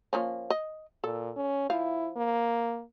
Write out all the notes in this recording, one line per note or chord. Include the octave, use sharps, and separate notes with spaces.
F3 A#3 C#4
D#5
A#2 A4
C#4
F3 E4 F5
A#3